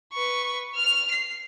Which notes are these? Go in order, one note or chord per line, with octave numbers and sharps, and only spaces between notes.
B4 C#6
F6 F7
C7